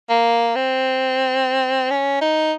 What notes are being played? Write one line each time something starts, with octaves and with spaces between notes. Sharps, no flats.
A#3
C4
C#4
D#4